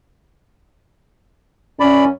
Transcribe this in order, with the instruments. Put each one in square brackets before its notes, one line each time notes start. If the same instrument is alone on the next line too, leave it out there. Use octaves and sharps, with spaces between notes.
[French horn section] F#2 C#4 [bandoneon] D5 B5